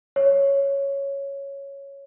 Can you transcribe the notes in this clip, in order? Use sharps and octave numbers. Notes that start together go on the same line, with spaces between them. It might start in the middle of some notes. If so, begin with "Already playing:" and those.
C#5